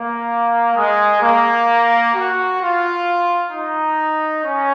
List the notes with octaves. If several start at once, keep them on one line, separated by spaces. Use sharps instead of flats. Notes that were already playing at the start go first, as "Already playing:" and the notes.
Already playing: A#3
G#3
A#3
F#4
F4
D#4
C#4